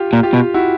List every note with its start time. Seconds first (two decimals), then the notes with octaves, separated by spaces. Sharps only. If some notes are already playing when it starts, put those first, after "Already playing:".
Already playing: F4 G4
0.13 A#2
0.23 F4 G4
0.33 B2
0.54 E4 F#4